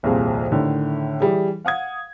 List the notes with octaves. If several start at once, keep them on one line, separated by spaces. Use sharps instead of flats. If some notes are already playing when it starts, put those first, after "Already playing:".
D#1 C2 F2 A#2 G#4 F5
A2 D3 D#3
E3 G3 G#4
F5 F#5 D#6 G#6